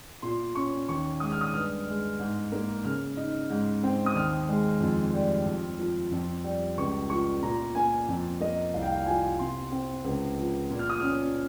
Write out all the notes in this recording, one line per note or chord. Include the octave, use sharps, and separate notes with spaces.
A#2 C6
C#4 C#6
D#2 C#6
G#3 D#6
F6
D#6
G2 F6
G#3
G#2
A#3
C#3 F6
D#4
G#2
C4
D#6
D#2 F6
G#3
F2
G3
F2
F3
F2
G3
C#2 C#6
F3 C#6
A#2 A#5
A#3 G#5
F2
A#3 D#5
C2 F5
G5
F5
F3 G#5
C3 C6
C4
C#2
F3
A#2
F6
D#6
C#4 F6